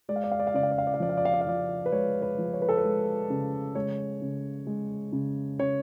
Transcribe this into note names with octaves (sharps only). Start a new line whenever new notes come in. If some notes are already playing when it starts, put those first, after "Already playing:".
G#3 D5
F5
D5
F5
D5
F5
C#3 D5
F5
D5
F5
D5
F5
F3 D5
F5
D5
F5
D5
F5
F3 D5
B4
G#3 C#5
B4
F3
C#5
B4
A4
B4
G#3
C#3
G#3 C#5
C#3
G#3
C#3
C#3 C#5